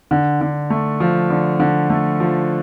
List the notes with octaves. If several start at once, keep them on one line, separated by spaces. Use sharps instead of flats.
D3
D3
A3
F3
D3
D3
A3
F3